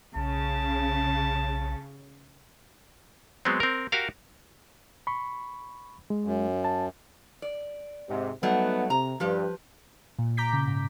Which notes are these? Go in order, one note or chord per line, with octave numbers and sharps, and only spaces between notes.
B1 C#3 A5
F#3 G#3 B3 C4
C4 A#4
F#4 G4 A#4 F5
B5 C#6
G#3
F#2
A5
D5
G#2 C3
F#3 G3 A3 B3 D#4 F#5
C3 A#5
G2 F3 G4 B4
A#2
A#5 D6 G6 B6
C#3
G#2